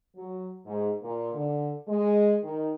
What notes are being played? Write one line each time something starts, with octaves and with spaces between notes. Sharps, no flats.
F#3
G#2
A#2
D3
G#3
D#3